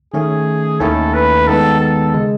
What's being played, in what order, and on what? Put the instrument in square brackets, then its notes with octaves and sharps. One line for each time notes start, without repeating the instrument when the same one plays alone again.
[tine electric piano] D#3 A3 C#4 [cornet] G#4
[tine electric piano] D#2 D#3 A3 C#4 E4 [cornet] A4
[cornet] B4
[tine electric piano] D#3 G#3 B3 [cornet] A4
[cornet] A4
[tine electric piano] C#3 G#3